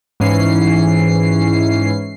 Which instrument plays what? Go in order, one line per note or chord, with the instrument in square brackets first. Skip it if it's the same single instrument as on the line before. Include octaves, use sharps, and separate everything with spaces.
[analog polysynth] G#2 E3 C#4 C7